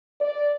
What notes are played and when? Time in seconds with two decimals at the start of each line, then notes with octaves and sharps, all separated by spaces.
0.21 D5